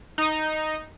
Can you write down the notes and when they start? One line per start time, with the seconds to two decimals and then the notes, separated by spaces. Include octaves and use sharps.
0.18 D#4